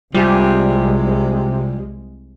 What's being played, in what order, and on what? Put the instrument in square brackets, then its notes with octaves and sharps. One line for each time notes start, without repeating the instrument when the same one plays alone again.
[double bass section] C2 G#3 [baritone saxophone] C3 [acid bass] G3 [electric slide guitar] F4 G4 G#5